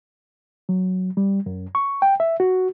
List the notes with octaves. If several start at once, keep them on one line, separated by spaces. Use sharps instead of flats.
F#3
G3
F#2
C#6
G5
E5
F#4